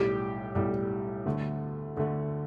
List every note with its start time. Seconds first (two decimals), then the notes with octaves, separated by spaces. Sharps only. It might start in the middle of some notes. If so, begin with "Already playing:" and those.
Already playing: B1 A2 G3 G4
0.55 B1 A2 G3
1.26 D2 D3 A3
1.97 D2 D3 A3